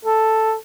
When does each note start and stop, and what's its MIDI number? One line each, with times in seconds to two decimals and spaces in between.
0.05 0.55 69